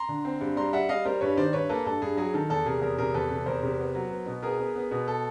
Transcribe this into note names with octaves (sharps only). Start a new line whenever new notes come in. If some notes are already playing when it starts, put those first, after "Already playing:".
Already playing: A#5 C6
D3
C4
G2
G3 A#5 C6
G3 E5 F#5
G3 D#5 F5
G3 A#4 C5
G2 B4 C#5
D#3 C5 D5
G2 B4 C#5
A#3 A4 B4
G2 A4
G2 G#4
F#3 G#4
D#3 A4
E2 A4
C3 G#4 A#4
E2 G#4 A#4
C3 G#4 A#4
E2 A4 B4
C3
E2 A#4 C5
C3
B3
F#3
B3
B2
B3 G#4 A#4
B3
B3
B2
A4